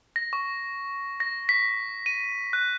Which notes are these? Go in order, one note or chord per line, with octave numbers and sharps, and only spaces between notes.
A#6
C#6
A#6
B6
D#7
F#6